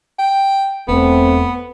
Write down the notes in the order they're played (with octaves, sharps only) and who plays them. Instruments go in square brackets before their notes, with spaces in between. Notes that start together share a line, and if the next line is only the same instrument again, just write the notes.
[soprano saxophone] G5
[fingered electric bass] E1 [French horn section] A3 C4 [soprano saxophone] B3